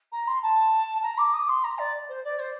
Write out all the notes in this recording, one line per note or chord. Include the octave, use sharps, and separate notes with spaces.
A#5
C6
A5
A#5
D6
D#6
C6
A#5
D5
C5
D5
C5